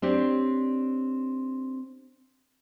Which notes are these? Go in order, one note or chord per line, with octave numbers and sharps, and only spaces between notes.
C4 D4 G4 C#5